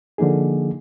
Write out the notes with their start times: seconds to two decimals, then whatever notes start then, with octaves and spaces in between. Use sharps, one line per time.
0.18 D3 F3 A#3 D#4 G#4